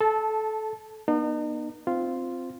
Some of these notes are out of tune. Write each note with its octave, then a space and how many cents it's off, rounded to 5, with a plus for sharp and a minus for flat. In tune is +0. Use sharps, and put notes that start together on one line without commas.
A4 -20 A5 +0
B3 -45 D#4 -40
C4 -5 F4 -5